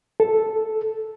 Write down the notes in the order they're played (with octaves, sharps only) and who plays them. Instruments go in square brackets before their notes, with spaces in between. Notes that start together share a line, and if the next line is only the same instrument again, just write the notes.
[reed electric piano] A4